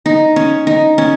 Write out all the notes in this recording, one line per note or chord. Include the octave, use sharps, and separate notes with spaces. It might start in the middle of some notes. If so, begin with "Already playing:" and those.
D#4
C#4
D#4
C#4